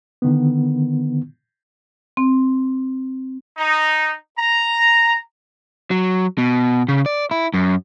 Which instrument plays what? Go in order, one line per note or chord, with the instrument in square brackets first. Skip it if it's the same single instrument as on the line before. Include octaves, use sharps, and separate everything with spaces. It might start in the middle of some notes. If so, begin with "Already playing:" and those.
[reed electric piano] D3 D#3 B3
[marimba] C4
[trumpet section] D#4
A#5
[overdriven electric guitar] F#3
B2
C#3
D5
E4
F#2